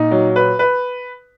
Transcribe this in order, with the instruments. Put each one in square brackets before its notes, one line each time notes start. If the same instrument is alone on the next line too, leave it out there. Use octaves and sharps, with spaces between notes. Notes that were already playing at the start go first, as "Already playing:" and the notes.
Already playing: [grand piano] A#2 [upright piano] D#4
[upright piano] F#3
B4
B4